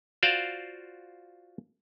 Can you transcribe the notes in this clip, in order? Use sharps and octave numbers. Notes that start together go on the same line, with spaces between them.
F4 F#4 C5 D5 F5 F#5